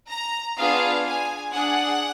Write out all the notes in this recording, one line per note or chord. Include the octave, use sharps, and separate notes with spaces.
A#5
B3 D4 F4 G#4 F5
G#5
D4 G#4 F#5